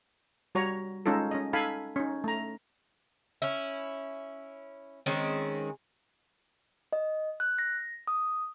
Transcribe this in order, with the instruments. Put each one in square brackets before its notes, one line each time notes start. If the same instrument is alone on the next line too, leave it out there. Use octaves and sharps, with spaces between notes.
[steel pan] G3 F#4 C#5 A#5
G#3 C#4 D#4 F4 A4
C#4 D#5
D#4 A4 F5 G#5 B5
C#4 D#4
A3 A#5
[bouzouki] C#4 E4
D#3 G#3 C4 C#4
[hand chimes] D#5
F#6
A#6
D#6